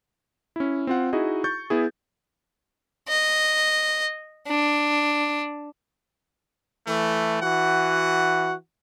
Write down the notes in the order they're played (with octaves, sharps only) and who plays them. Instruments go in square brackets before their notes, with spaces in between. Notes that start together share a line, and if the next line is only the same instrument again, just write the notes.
[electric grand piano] C#4 E4
C4 F4 F#5
D#4 E4 F#4 G#4 D#5
C#6 G6 A6
B3 E4 G#4
[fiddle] D#5
D4
[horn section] E3 A3
E3 F#4 F#5